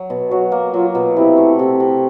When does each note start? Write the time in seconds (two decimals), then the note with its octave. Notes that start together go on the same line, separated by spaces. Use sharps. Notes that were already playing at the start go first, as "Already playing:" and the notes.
Already playing: F#3
0.10 B2
0.31 F#3 F#4
0.52 A#3
0.74 F#3 F4
0.95 B2
1.15 C3 E4
1.37 A3
1.59 C3
1.80 C3